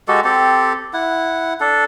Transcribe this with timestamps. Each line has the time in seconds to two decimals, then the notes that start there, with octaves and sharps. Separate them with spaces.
0.08 G#3 F#4 G4 A4
0.24 C4 G4 A4
0.93 E4 F#5
1.60 D4 A4